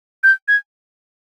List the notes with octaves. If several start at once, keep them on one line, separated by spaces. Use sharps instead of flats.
G6
G#6